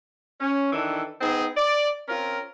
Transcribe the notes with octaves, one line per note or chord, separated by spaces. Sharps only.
C#4
D#3 E3 D4 A4
B3 C4 D#4 G#4
D5
C4 C#4 F4 A#4